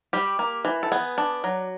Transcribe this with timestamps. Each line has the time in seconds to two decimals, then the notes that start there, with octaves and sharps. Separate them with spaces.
0.13 G3 G4
0.39 A#3
0.65 E3
0.83 A4
0.92 B3 G#4
1.18 D4
1.44 F#3